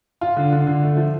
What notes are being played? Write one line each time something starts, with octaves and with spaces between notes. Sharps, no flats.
F4
D3
D3
D3
A3
F3